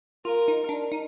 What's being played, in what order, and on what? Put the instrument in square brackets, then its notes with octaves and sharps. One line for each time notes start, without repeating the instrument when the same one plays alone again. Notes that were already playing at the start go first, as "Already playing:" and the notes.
[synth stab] F4 [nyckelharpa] A#4
[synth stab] D#4
D4
D#4